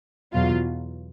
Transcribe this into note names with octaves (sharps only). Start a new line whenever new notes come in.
E2 B2 F#3 F4